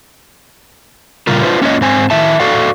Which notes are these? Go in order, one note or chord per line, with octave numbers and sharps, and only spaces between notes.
A#2 C#3 G3 F4 A#4
D4 F4 B4 C5
A#3 C#4 F4 G#4 C#5 D#5
G#2 C4 G#5
D#3 E4 E5 A5
F#4 A4 D5 F5